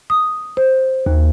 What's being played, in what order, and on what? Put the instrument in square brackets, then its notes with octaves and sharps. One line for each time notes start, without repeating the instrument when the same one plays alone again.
[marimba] D#6
C5
D#2